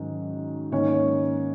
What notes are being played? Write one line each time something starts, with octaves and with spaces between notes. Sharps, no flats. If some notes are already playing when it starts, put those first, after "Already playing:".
Already playing: G#2 D#3 F#3 C#4
G#2 D#3 A#3 C#4 C#5
C#5